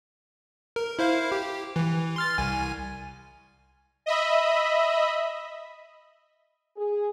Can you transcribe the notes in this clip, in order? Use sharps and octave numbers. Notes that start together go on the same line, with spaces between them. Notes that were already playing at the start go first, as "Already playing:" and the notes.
A#4
E4 C5 F5
G4
E3
C6 F6 A6
C2 G#5
D#5 E5 B5
G#4